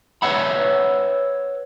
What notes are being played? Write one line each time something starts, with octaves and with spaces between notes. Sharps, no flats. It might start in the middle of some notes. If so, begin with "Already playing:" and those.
B4 C#5 E5 F#5 B5